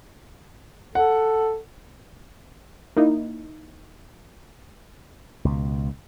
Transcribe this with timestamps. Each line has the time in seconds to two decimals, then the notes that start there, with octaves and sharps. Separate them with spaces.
0.95 A4 F#5
2.96 A#3 D#4 E4
5.45 C#2 B2